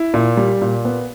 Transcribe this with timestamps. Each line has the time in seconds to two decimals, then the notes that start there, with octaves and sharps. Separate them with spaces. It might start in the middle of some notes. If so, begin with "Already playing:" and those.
Already playing: E4
0.14 A#2
0.37 G3
0.61 A#2
0.85 B3